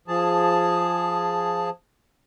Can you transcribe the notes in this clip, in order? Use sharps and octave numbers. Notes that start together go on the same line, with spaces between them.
F3 G#4 A5